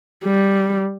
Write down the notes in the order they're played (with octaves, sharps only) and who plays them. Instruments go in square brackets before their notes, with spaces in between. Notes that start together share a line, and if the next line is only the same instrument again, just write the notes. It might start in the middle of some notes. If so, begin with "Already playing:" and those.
[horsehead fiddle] G3